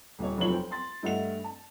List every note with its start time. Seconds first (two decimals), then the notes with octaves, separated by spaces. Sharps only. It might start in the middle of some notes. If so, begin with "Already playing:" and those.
0.19 D#1 C#5
0.37 F1 F#3 C4 F4 C#5 F#7
0.52 C5 G5
0.71 C6 A6
1.03 G2 A3 D#5 F#5 F7
1.44 A5